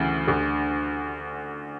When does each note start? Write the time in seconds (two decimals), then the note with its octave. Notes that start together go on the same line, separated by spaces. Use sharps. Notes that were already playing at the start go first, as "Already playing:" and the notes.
Already playing: D2 C#3 E3
0.27 D2 D3